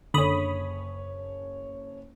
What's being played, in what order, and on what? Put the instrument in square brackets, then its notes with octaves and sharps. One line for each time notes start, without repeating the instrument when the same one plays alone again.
[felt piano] F#1 C#5 [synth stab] D3 B5 D#6